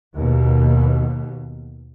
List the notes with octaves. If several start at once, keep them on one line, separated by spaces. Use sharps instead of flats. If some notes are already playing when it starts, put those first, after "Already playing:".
D#2 B2